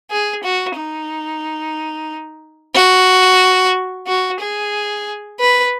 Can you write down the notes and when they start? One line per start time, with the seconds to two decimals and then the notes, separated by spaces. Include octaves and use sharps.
0.11 G#4
0.44 F#4
0.76 D#4
2.75 F#4
4.07 F#4
4.40 G#4
5.40 B4